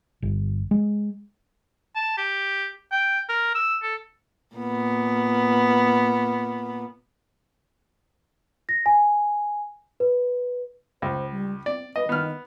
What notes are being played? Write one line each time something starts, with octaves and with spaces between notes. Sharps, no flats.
G1
G#3
A5
G4
G5
A#4
E6
A4
A#2 B3
A#6
G#5
B4
C#2 C5
G3
C4 D5
B4 D#5
D#3 B3 F6